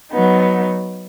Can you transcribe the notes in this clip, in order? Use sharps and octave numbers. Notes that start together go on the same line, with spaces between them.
F#3 B3 D#4